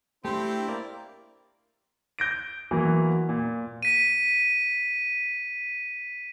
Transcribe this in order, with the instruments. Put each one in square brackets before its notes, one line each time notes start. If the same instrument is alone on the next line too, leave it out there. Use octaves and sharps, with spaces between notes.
[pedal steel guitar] A3 D4 [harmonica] C4 E4 C5 [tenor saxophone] G4
[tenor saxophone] A#3 [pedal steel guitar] D5 A#5 D6
[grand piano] G6 A#6 D7
E2 E3 F#3 A#3
A#2
[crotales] B6 D#7